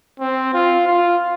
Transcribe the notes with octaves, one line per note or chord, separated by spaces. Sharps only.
C4
F4
F4